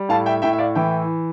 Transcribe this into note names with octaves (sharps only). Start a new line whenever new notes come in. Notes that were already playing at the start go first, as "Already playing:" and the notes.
Already playing: G3
A2 F5 A5
E5 G5
A2 E5 G5
E5
D5 F5
E3 E5 G5